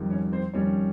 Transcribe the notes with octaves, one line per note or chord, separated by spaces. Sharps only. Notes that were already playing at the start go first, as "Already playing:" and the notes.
Already playing: F2 D#3 G3
C#4 C#5
C4 C5
F2 D#3 G3 C#4 C#5